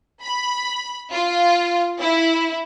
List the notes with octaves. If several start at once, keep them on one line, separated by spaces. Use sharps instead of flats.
B5
F4
E4